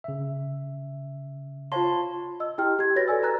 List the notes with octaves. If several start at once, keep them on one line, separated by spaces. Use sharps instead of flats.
C#3 E5
F4 C5 C#5 F5 A5 C6
D#5 E6
E4 G4 G5 F6
G4 G#6
F#4 B4 C#5 A6 A#6
A4 D5 G#5 E6
B4 A#5 F#6 A6